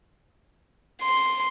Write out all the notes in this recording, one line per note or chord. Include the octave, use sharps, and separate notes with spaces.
C6